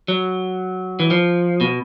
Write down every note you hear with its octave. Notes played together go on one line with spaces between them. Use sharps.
F#3
E3
F3
B2